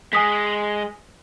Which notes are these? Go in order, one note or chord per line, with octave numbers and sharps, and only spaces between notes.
G#3 G#5 D#6 B6